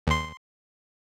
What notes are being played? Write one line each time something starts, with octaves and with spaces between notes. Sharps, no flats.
D#2 C6